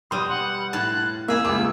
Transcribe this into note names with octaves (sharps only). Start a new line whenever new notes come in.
B2 G3 C6 D#6
F#5
A2 F4 A5 F#6
G3 A#3 G#4 E5 E6
C#2 A3 D6